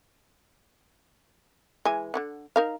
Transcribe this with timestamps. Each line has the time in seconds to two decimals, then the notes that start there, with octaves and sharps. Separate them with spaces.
1.85 E3 G#3 G#5
2.14 D3 E3 F#5
2.56 D#4 A#4 F5